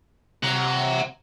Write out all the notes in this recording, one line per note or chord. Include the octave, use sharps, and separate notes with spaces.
C3 F#5 A#5